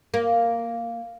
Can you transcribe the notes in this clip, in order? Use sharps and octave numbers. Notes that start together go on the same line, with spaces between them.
A#3